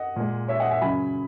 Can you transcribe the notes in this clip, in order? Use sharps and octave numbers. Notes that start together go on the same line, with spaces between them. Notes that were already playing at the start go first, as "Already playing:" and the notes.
Already playing: D#5 F#5
A#2 G#3
C#5 E5
D#5 F#5
E5 G#5
C#3 F#3 G#5 B5